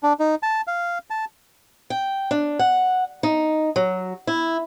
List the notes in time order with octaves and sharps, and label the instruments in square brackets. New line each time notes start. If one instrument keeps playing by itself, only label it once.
[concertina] D4
D#4
A5
F5
A5
[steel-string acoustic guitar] G5
D4
F#5
D#4
F#3
E4